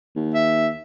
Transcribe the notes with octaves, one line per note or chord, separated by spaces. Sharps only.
D#2
E5